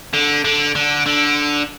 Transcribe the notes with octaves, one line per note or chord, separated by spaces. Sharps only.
D3
D3
D3
D3